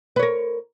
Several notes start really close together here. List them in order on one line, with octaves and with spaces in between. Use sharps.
B4 C#5 A#4